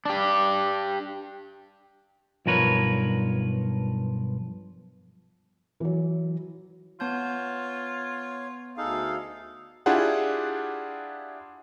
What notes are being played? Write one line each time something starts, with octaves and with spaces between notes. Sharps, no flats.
D4 G4
B1 G2 F3 A#4 B4 C#5
E3 F#3
B3 F4 C#5 A5 G6
D2 D#4 G#4 A4 F5
D4 E4 F4 G4 G#4 F#5